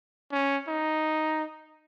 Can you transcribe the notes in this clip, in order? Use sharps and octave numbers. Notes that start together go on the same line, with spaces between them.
C#4
D#4